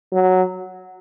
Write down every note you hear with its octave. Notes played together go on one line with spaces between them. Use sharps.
F#3